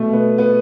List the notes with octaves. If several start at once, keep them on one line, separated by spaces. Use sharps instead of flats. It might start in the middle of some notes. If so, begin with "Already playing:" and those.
Already playing: B2 A3
B3
B3